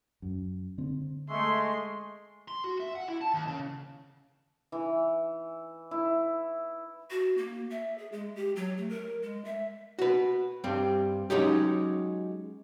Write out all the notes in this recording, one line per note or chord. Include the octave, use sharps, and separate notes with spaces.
F#2
D3 C4
G#3 A3 E5 C6 C#6
C6
F#4
E5
F#5
E4
A5
D#2
C#3
E3
E4
F#4
A#3
E5
G#4
G#3
G4
F#3
A3
A#4
G#3
E5
F#4 B4
G2 G3 C4
F#3 G#3 C#4 D#4 G4